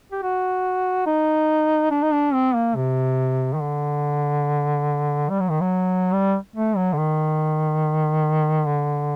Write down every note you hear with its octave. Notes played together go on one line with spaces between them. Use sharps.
G4
F#4
D#4
D4
D#4
D4
C4
A#3
C3
D#3
D3
G3
F#3
D#3
F#3
G3
A3
F#3
D3
D#3
D3